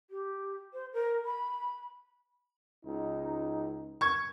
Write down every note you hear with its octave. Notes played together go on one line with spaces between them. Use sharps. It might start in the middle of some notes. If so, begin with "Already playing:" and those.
G4
C5
A#4
B5
C#2 D#4
C#6 G#6